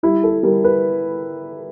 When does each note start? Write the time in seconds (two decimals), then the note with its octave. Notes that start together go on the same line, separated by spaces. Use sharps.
0.03 G3 E4
0.24 A4
0.43 G3 A#4
0.64 B4